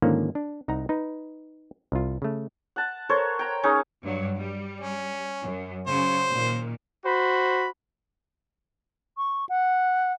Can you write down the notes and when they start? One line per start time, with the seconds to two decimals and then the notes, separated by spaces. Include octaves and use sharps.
0.02 G#2 D3 D#3 F3 A#3 C#4
0.35 D4
0.68 C2 D#4 F#5 A#5
0.89 D#4 B4
1.92 C2 F4
2.22 C#3 A3
2.76 F#5 A5
3.09 A4 A#4 C5 C#5
3.39 G5 A#5
3.63 G#3 C#4 D#4
4.02 G2 F#3
4.36 G3
4.81 C#4
5.42 F#2
5.87 C#3 F#3 C5
6.30 A#2 D#3
7.04 F#4 C5 B5
9.17 C#6
9.49 F#5